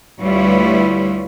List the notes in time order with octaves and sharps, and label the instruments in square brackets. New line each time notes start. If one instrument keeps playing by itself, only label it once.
[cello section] D2 G3 E4 F4 B4 C#5